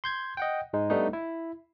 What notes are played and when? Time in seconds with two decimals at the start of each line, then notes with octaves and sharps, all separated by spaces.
0.04 C6 G6 G#6
0.37 D#5 F#5 G5
0.73 G#2 G#3 D#4
0.90 G3 A3 B3 D4 D#4
1.13 E4